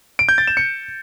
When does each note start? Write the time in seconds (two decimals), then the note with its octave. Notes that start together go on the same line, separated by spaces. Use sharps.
0.19 D7
0.29 G6
0.38 A6
0.47 E7
0.57 C#7